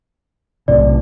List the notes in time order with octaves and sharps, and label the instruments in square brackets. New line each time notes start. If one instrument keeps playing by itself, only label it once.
[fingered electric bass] B1 A2 C3 [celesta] D5